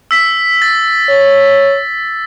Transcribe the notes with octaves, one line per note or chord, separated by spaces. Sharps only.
E6 B6
A6
C#5